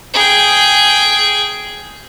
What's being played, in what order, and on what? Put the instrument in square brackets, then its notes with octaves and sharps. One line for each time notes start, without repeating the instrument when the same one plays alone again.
[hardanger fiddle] G#4 G5